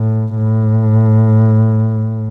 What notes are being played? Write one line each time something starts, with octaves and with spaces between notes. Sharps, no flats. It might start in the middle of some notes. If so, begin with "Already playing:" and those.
Already playing: A2
A2